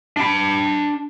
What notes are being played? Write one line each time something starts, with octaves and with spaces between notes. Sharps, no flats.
D4 B5